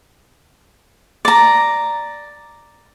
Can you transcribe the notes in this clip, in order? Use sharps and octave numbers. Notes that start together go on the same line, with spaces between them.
D5 A#5